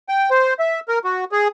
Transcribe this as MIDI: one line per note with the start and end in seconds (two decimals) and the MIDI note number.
0.09 0.30 79
0.30 0.54 72
0.59 0.80 76
0.88 0.99 70
1.04 1.25 66
1.32 1.48 68